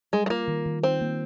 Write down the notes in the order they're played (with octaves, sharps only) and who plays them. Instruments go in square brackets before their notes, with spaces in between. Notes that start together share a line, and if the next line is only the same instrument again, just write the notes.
[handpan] G3 [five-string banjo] G#3
[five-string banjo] G#3
[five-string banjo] A#3 [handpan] F4
[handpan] D#3
D#3
[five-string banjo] C4 [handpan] D#4
[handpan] A#3